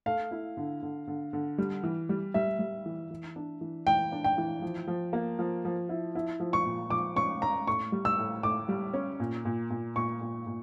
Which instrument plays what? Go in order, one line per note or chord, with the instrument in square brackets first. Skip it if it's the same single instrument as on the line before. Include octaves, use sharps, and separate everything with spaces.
[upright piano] A3 [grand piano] F5
[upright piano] E4
D3
D3
D3
D3
G3
E3
G3
[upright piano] G3 [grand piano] E5
[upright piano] G3
E3
E3
D4
E3
[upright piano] E3 [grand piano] G5
[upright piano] D4
[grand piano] G5
[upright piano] E3
F3
F3
A#3
F3
F3
E4
E4
F3
[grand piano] C#6
[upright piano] A#2
[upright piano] F3 [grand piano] D6
[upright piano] C#4 [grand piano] C#6
[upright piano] C#4 [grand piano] A#5
[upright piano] A2 [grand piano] C#6
[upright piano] G3
[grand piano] E6
[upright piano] A2
[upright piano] A2 [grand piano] D6
[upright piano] G3
C#4
A#2
A#2
A#2
[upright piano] A#2 [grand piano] C#6
[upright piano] A#2
A#2